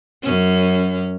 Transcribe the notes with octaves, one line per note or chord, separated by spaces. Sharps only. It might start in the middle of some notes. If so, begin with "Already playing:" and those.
F#2 C#4